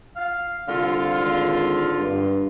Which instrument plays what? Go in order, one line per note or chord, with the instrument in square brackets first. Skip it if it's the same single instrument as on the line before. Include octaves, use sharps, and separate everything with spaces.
[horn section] F5
[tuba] C2 [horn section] D3 F4
[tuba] G#1
G2